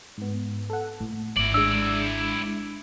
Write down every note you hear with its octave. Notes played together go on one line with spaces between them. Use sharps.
G#2 B3
A4 F#5
A2 A#3 B3
G#1 E4 D5 F#7
G#3 D4 E6